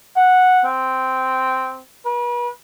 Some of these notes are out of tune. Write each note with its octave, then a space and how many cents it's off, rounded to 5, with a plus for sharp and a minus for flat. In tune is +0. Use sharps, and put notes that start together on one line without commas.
F#5 -10
C4 -10
B4 -40